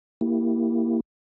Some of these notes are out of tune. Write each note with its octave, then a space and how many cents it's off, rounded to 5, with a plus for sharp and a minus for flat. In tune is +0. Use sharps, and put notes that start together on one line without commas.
A#3 +0 E4 +0 G4 +0